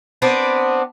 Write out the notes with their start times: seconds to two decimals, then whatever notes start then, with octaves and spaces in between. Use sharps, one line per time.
0.22 B3 C4 D4